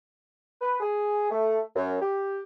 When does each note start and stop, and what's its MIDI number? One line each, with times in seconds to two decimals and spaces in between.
0.61 0.76 71
0.80 1.28 68
1.30 1.60 57
1.75 1.97 42
2.01 2.42 67